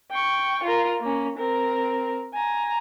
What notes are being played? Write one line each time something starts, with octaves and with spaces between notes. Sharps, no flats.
G5 C#6
F4 A#4
A#3 C#4
C4 A#4
G#5 A#5